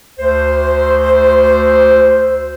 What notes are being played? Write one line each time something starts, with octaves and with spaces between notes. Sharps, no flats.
D2 C5